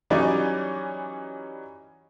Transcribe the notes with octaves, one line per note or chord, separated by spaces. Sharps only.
E3 F#3 G3 C#4 D#4 D5